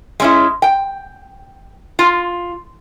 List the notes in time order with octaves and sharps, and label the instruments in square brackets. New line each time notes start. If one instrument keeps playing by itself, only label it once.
[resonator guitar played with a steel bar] G#3 C#4 E4
G5
F4